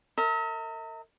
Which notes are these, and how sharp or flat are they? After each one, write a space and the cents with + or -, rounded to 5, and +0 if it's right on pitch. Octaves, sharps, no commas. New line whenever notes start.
A#4 -35 E5 -45